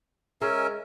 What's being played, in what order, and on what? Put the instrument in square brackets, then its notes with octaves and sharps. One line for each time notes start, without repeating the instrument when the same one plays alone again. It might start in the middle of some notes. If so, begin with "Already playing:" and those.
[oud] G#3 [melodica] C#4 A#4 E5